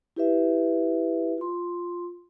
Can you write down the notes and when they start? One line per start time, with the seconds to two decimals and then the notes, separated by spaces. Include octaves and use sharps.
0.16 E4 G4 B4 E5
1.38 F4 C6